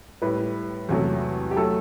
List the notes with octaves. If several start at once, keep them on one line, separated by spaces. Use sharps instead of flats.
A2 G3 B4
E2 C3 F#3 A3
G4
F#3 A3 A4